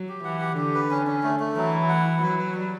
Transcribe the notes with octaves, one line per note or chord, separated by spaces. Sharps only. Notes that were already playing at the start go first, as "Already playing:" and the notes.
Already playing: F#3
G4
E3 F#5
G4
D3 G4
B4
C#4
C#4
A3
A3
E3 F#3
E4
F#5
E4
F#3 B4
B4
G3